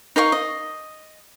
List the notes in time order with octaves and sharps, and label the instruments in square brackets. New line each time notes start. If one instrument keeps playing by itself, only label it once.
[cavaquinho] D#4 A#4 F5 C#6
D#5